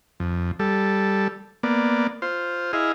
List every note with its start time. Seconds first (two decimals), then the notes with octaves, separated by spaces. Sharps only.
0.20 F2
0.59 G3 A4
1.63 A#3 B3 D5
2.22 F4 C5
2.73 E4 G#4 D#5 F5